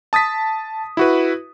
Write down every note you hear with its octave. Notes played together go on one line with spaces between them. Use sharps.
A5 D#6 A6 B6
E4 F#4 B4